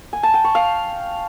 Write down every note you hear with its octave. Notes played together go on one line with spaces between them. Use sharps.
G#5
A5
G5
C#6
F5